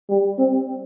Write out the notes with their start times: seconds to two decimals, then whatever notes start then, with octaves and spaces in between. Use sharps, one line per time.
0.09 G3
0.38 C4